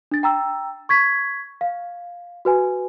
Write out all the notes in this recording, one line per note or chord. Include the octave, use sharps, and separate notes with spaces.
D4 A6
G5 A#5 E6
C#6 G#6 B6
F5
F#4 B4 G#5